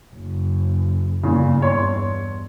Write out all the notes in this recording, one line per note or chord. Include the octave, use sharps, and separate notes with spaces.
F#1
E2 G2 A#2 C#3
C#5 D5 C6